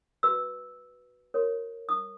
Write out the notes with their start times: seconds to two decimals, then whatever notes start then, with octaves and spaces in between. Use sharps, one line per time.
0.23 F#4 B4 E6
1.34 F#4 A#4 C#5
1.89 D#6